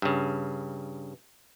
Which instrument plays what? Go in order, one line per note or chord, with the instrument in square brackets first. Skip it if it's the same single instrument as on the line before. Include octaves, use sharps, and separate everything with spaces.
[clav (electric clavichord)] G2 C#3